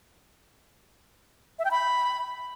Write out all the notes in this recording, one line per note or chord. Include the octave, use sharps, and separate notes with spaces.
E5
G5
B5